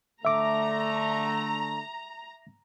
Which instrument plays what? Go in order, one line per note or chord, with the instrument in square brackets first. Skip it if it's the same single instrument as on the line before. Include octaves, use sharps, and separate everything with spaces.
[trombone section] D3 A3 [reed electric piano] E5 D6 [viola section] A#5